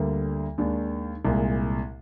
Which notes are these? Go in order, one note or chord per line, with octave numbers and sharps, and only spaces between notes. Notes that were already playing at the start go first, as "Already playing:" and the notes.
Already playing: D2 D3 G3 A#3
D#2 D#3 G#3 D4
C2 A#2 G#3